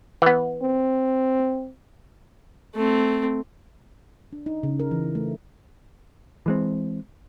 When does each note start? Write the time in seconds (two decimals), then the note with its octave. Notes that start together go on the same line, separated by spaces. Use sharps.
0.22 E3 B3
0.62 C4
2.75 A3 C4
4.33 D4
4.46 D#4
4.63 C#3
4.80 A#4
4.91 E3
5.15 A3
6.46 E3 G#3 C4